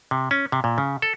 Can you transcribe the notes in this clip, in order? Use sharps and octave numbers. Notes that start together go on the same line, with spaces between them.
C3
C#4
C3
A#2
C#3
A4